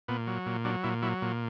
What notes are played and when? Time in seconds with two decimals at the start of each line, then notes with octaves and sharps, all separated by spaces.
0.08 A#2 B3
0.27 F#3
0.46 A#2
0.64 F#3 D4
0.84 A#2 E4
1.03 F#3 E4
1.22 A#2